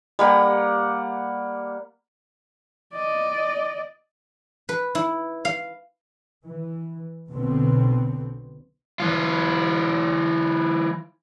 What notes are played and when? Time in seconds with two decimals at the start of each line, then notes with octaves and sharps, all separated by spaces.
0.19 G3 A#3 F#5
2.94 D5 D#5
4.69 B4
4.95 E4
5.45 F5
6.44 E3
7.30 B1 B2 D3 B3 C4
9.00 E3 F4